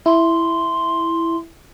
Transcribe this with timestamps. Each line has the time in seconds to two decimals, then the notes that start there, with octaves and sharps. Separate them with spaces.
0.06 E4 C6